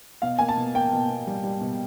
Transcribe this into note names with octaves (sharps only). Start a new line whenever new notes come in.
B2 F5
A#3 G#5
A5
B2
A#3 G5
B2
B2
G3
G3
B2